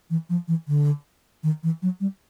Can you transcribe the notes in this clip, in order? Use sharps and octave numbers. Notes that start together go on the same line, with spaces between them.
E3
F3
E3
D3
D#3
E3
F#3
G3